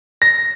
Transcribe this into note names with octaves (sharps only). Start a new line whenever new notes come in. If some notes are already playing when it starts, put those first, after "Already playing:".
A#6